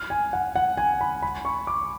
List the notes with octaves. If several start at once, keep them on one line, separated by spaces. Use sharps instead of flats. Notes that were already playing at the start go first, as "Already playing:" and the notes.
Already playing: F6
G#5
F#5
F#5
G#5
B5
B5
C#6
D6